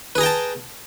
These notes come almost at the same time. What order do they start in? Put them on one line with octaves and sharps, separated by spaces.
B4 G#4 A#5 G5 A5